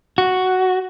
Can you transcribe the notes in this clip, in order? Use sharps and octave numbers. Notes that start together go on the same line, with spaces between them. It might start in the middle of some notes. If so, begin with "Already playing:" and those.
F#4